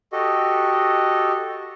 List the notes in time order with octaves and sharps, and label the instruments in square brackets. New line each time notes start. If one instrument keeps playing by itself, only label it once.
[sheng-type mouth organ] F#4 G4 A4 D#5